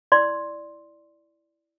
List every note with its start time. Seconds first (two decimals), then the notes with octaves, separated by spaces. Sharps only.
0.12 E4 D5 C6